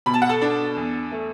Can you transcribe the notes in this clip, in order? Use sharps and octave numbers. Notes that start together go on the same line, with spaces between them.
B2 B5
A5
F#5
A4 A5
D4
E2
A3